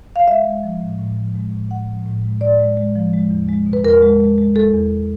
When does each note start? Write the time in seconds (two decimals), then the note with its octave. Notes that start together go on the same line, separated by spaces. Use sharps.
0.16 F5
0.28 G#3 E5
0.45 G#3
0.63 F3
0.81 A2
0.99 A2
1.17 F3
1.35 G#3
1.52 A2
1.70 A2 F#5
1.88 F3
2.06 A2
2.24 G#3
2.41 A2 D5
2.59 G#3
2.77 G#3
2.96 F3
3.13 G#3
3.31 E2
3.49 G#3
3.66 B2
3.73 B4
3.84 E2 A#4
4.02 G#3
4.20 G#3
4.38 G#3
4.55 G#3 A4
4.74 E2